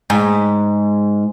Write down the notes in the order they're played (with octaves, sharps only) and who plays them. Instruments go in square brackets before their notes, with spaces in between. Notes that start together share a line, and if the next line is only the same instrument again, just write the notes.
[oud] G#2